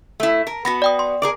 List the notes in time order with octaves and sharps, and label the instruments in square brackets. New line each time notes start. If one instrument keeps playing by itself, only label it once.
[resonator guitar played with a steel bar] A3 E4
A#4
[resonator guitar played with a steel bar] B3 F#4 [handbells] B5 A#6
[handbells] D5 G5 D#6
C6
[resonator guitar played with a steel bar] G#4 A#4 D5